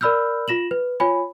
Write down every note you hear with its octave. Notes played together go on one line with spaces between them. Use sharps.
A#4 D5 B5 E6 F6 G6
F4 A#6 E7 F#7
B4
F4 C#5 G#5 B5